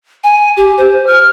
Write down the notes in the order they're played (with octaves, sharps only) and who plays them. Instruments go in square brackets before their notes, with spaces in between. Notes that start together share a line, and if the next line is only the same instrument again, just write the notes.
[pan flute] G#5
G4
C5
F6